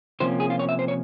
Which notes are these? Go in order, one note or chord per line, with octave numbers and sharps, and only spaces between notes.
C3 F3 A#3 C#4 C5
G#4
F4
C#5
E5
C5
C#5